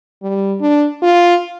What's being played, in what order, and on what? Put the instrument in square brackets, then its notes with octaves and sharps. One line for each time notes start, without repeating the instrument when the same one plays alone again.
[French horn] G3
D4
F4